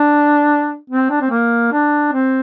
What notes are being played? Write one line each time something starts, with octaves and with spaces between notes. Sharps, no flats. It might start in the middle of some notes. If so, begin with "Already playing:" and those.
Already playing: D4
C4
D4
C4
A#3
D4
C4